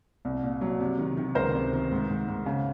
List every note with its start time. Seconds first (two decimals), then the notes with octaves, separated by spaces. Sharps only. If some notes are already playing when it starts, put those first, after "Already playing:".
0.25 C2
0.43 A#2
0.61 F#3
0.80 C3
0.99 D#3
1.17 D#3
1.35 C#2 A#4 C5
1.54 C3
1.73 D#3
1.91 G#2
2.09 G#2
2.28 G#2
2.46 C#3